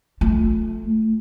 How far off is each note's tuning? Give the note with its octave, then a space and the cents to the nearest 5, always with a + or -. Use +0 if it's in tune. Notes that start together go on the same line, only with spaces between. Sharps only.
A3 +0 F4 +0